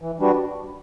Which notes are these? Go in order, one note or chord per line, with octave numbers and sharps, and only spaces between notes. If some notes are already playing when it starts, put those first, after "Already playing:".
E3
G3 D4 F#4 B4